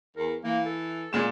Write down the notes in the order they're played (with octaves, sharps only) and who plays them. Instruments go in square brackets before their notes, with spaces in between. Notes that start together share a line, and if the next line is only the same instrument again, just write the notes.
[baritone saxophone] E2 [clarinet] A#4
[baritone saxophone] E3 [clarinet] A#3
[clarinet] A4
[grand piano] A#2 E7 [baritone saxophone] G#3